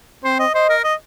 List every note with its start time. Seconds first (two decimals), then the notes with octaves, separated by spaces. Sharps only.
0.24 C4 C5
0.39 D#5
0.54 C5 D#5
0.69 A#4
0.84 D#5